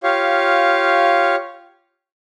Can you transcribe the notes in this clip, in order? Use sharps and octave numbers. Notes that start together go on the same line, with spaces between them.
F4 G4 C#5 F5